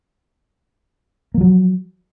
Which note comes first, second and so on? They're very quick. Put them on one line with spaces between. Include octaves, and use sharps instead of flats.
A#3 F3 F#3